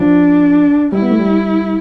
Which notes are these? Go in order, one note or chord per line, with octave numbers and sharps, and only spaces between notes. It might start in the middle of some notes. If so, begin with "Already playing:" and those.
Already playing: F3 D4
G3 E4
B3
A3
G3